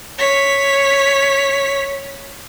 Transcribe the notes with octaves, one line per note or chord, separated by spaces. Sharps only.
C#5 B6